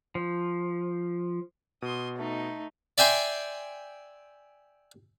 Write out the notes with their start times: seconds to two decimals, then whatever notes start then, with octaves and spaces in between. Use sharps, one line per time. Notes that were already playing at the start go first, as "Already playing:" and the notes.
0.15 F3
1.82 B2 C6 D#6
2.17 A3 D#4
2.98 D5 E5 G5 G#5 C6